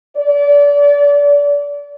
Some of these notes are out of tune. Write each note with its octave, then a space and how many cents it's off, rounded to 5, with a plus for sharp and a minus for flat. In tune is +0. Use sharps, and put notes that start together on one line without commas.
D5 -30